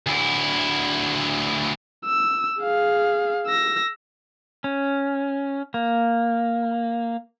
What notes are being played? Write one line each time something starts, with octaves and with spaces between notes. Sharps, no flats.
D2 E4
E6
G#4 F5
E6 A#6
C#4
A#3